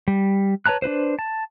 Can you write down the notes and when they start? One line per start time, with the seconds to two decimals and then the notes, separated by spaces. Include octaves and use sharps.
0.08 G3
0.66 B4 C#5 A5 A#5 F#6
0.82 D4 E4 B4 C5
1.19 A5